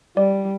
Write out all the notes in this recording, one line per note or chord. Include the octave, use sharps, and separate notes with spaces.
G3 D5